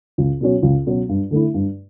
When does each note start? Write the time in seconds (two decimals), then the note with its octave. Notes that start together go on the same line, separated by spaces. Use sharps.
0.18 C#2
0.41 B2 F#3 C#4
0.63 C#2
0.86 B2 F#3 C#4
1.09 G2
1.31 D3 A3 E4
1.54 G2